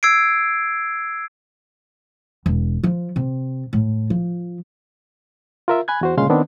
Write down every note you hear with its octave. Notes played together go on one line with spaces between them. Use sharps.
E6 G#6 C7 D7
E1
F3
C3
A2
F3
F4 A#4 E5
G#5 B5 F#6 G#6
E2 F#4 C5
D2 A#2 C#3 G#3 F5 C6
D#3 B3 C4 D4